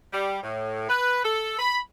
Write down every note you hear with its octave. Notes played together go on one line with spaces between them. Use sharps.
G3
A2
B4
A4
B5